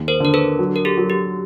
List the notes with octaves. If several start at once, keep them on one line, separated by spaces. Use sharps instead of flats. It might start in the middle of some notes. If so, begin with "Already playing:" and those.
Already playing: D#2
A#4 C5
D3 A#4
A4 B4
F#3
A#4
G4 A4
F#3
G4